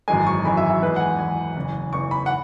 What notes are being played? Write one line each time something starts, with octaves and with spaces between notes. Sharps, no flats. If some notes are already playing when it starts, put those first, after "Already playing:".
G#1 F#2 E3 G#3 G#5
C#6
G#1 F#2 E3 G#3 B5
E5
E5
E2 E3 G#3 B4
F#5
G#5
E2 E3 G#3 G#5
F#1 E2 E3
F#1 E2 E3 C#6
B5
F#5